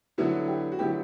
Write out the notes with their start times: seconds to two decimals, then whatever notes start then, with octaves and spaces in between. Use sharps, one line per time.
0.18 D3 F#3 B3 E4 F#4
0.48 G4
0.72 F#4
0.79 D3 F#3 B3 E4 G4